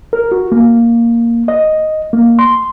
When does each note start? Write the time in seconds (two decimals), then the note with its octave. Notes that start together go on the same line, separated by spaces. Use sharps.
0.13 A#4
0.32 F#4
0.52 A#3
1.48 D#5
2.13 A#3
2.39 C6